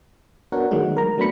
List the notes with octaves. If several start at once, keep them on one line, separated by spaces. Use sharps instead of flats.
B3 D4 F#4 A#4 C#5 F#5
D#3 F#3 G#3 A3 F#4
A#4 A#5
F#3 A3 B3 D4 B5 C#7